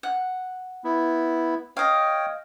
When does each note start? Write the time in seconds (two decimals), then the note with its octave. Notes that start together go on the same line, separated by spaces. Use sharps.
0.03 F#5
0.84 B3 E4
1.77 C#5 D#5 F5 G5